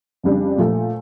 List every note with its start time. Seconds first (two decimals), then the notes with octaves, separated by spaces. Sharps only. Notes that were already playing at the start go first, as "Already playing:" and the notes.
0.23 F2 C#3 G3 D4
0.58 A#2 F3 A3